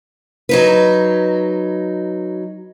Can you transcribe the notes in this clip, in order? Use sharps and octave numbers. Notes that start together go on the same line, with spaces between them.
F#3 D#4 B4